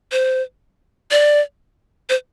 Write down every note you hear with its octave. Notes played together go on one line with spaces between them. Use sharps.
C5
D5
C5